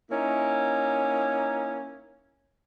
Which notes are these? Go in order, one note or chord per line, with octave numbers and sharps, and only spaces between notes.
A#3 C#4 D#4 E4